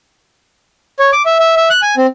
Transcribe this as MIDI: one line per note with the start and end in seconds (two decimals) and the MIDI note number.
0.99 1.11 73
1.13 1.22 86
1.26 1.38 76
1.40 1.56 76
1.56 1.69 76
1.70 1.81 90
1.82 1.95 80
1.97 2.06 60